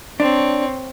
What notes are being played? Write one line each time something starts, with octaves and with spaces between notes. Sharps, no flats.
C4 D4 C#5